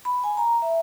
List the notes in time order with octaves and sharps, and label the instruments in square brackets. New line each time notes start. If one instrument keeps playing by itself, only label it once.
[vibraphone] B5
G#5
A#5
E5